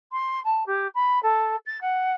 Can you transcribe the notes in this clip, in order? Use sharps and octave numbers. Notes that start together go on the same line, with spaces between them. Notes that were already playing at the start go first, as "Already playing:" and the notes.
C6
A5
G4
B5
A4
A6
F#5